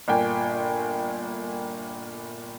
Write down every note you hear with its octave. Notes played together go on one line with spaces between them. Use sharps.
G1 A#2 G5 G#5